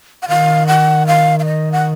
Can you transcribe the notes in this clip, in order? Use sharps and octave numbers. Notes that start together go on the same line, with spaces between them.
F#5
D#3 F5
F#5
F5
F5
D#5
F#5